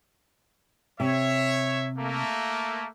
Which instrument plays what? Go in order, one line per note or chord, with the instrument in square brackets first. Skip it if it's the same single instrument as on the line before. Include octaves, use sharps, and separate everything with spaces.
[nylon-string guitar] C3 [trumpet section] C#5 E5
[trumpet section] A3 A#3